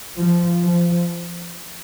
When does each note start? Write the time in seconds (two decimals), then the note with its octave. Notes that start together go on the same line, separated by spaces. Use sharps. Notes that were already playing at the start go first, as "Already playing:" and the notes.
0.17 F3
0.62 F3